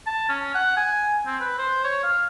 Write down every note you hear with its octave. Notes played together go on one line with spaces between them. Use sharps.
A5
C#4
F#5
G#5
C4
B4
C5
C#5
F5